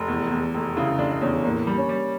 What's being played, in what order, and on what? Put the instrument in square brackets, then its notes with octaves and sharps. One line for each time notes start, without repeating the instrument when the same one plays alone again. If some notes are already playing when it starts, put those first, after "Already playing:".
Already playing: [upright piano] F1
E2
E2
F1
[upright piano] C#3 [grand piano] E4
[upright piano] F1 [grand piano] D4
[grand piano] D4
[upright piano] E2 [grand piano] C#4
[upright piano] A2 [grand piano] A#3
[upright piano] G3
[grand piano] C#4
[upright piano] G3